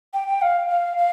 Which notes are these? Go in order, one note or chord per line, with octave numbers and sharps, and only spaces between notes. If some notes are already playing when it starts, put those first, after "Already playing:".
G5
G5
F5
F5
F5